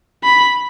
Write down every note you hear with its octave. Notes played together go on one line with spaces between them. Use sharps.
B5